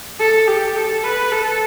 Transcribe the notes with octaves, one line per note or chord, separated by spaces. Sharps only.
A4
G4
A4
B4
A4